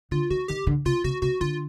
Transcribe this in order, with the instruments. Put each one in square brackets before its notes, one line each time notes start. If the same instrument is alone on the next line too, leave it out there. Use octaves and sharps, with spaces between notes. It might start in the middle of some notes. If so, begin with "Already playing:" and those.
[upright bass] D3 [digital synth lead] F4
[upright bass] D#3 [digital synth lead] F#4
[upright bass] D#3 [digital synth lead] G4
[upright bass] D3
[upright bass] C3 [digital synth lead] F4
[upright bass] C3 [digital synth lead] F#4
[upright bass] C3 [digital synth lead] F#4
[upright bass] D3 [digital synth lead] F4